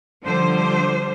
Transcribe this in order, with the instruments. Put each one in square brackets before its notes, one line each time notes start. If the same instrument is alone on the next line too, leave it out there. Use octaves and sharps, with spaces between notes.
[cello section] D3 F3 G3 C5